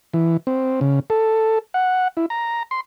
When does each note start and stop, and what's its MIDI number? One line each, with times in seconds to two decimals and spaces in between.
0.14 0.37 52
0.47 0.80 60
0.81 1.00 49
1.10 1.59 69
1.74 2.08 78
2.17 2.26 64
2.30 2.63 82
2.71 2.81 84